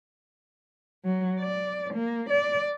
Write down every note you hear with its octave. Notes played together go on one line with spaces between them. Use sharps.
F#3
D5
A#3
D5